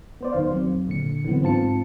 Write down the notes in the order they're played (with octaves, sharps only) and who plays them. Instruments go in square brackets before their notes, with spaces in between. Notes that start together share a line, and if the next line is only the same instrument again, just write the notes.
[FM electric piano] B3 C5 D5
F#2 D#3 C5 F5
F2 F#3 C4
A#2 D3 C#7
D3 E3 F#3 B3 C4
G#2 C4 F4 A5 C#7